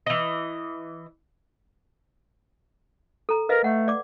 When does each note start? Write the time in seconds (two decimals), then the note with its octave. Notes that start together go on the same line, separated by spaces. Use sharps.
0.06 E3 D#5
3.29 A4 A#5
3.49 A#4 B4 D#5 F5
3.64 A3 F#5
3.88 D5 D6